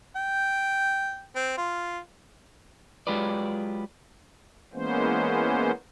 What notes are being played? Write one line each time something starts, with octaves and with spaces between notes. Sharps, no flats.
G5
C4
F4
F#3 G#3 F4 G4 B4 D5
E3 G#3 A#3 B3 C#4 C5